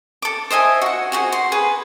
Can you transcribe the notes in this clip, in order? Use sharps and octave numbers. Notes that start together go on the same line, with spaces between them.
A4 D6
C5 D#5 E5 G#5
F#4 F#5
F#4 G#4 C5
C6
G#4 B4